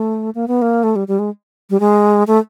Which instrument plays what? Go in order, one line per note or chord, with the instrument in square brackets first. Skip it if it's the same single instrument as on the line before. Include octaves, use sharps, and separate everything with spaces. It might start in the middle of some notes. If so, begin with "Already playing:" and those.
Already playing: [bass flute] A3
A#3
B3
A#3
A3
G3
G3
G#3
G3
G#3
A3